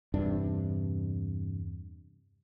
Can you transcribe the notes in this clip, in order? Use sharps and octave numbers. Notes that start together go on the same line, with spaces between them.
E2 G2 C3 D4